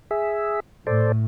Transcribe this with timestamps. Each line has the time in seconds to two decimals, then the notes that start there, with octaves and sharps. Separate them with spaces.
0.11 G#4 E5
0.87 A2 A4 C5 D5